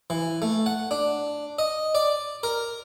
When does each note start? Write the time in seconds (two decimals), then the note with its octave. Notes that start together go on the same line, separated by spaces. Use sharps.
0.10 E3
0.42 A3
0.66 F#5
0.91 D4
1.59 D#5
1.95 D5
2.43 A#4